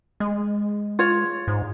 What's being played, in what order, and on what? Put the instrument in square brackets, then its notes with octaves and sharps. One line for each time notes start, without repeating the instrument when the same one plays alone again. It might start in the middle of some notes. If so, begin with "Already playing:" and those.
[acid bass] G#3
[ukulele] F4 C#5
[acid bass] G#2